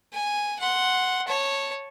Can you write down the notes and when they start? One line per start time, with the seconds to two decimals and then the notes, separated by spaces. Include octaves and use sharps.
0.13 G#5
0.59 F#5 C6
1.28 C#5 A5